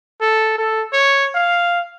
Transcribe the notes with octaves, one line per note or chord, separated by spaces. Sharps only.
A4
A4
C#5
F5